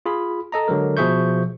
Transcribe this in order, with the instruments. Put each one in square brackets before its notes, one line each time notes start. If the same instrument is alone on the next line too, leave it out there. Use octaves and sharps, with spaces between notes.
[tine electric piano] F4 G#4 B5
A4 D#5 A#5
D3 F#3 G#3 A#4
B2 F3 G#4 E5 C#6 G6